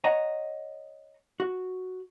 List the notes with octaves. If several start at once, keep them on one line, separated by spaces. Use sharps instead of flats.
C#5 D#5 F#5 A#5
F#4